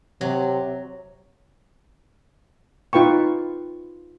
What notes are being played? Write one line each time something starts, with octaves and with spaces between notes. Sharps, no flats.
C3 F#3
D#4 F4 B4 G5 C#6